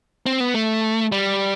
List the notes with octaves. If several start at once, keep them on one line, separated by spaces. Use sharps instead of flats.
C4
B3
A3
G3